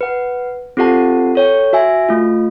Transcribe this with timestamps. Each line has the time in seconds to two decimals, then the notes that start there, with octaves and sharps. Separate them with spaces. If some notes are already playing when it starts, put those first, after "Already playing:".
0.01 B4 F#5
0.77 C4 F4 G4 A4 F#5 A5
1.35 A4 C#5 G5
1.73 F#4 E5 G#5
2.09 A3 F4